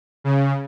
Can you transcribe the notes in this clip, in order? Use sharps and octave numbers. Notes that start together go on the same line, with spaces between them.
C#3